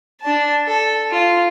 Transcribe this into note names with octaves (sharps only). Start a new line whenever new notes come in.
D4 A5
A4
F4